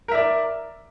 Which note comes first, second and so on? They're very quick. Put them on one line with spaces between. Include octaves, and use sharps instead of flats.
A#4 E5 D5